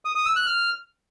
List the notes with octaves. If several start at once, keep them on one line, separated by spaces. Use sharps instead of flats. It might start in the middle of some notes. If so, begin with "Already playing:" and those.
D#6
D#6
E6
F#6
F6